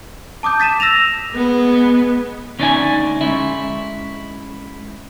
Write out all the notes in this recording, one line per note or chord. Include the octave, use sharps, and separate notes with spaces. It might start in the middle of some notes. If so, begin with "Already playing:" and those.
A5 D6 D#6 G6
A6 B6 D#7 E7
E6 A#6 E7 F7
G#3 B3
D2 C#4 D#4 D5 E5 G#5
G#3 C#4 E4 E5